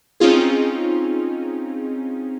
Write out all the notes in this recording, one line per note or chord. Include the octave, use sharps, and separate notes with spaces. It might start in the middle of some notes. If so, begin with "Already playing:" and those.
C4 C#4 D#4 F4 G#4